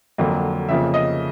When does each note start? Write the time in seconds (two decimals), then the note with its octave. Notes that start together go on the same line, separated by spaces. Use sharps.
0.18 F2 D3 F#3 A#3
0.69 F2 C#3 F3 A#3 E5
0.94 D#5